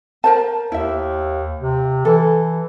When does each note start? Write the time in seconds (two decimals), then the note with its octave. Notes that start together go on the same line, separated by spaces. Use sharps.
0.24 A#4 C5 A5
0.72 D#2 E4 E5
1.59 C3
2.05 E3 A4